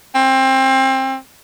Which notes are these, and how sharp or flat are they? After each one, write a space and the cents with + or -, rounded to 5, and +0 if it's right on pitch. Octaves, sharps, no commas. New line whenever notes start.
C4 +25